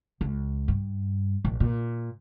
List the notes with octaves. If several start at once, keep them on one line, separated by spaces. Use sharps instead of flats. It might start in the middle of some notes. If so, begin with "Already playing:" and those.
C#2
G2
A#1
A#2